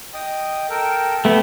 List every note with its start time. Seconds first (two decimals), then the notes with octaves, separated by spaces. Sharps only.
0.14 D#5 G5 D#6
0.70 A4 A#4 G5
1.25 A3 B3 G4 F#5